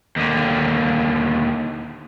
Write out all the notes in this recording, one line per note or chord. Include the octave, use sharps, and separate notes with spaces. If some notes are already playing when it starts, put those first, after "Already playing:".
D#2 D3